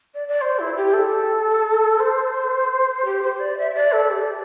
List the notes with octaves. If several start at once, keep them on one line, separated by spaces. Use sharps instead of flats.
D5
D5
C5
E4
G4
A4
C5
G4
C5
D5
E5
D5
A4
G4